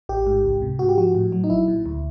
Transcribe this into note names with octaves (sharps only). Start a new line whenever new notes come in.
A1 G4
G#2
C#2
C3
G#2 F#4
G4
F3 F#4
A2
F#3
D#4
A#1 E4
A#2
D2